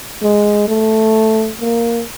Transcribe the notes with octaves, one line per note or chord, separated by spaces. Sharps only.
G#3
A3
A#3